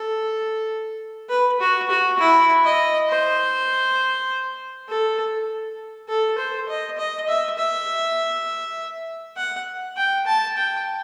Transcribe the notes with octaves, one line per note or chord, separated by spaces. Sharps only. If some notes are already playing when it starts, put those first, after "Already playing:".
Already playing: A4
B4
F#4
F#4
E4
D#5
C5
A4
A4
C5
D#5
D#5
E5
E5
F#5
G5
A5
G5